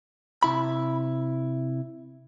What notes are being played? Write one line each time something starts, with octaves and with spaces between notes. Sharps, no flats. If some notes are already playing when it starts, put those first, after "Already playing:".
C3 E4 B5